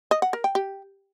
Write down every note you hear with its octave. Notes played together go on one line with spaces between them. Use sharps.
D#5
F#5
A#4
G5
G4